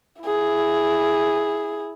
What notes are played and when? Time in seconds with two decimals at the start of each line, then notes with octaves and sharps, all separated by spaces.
0.22 E4 G#4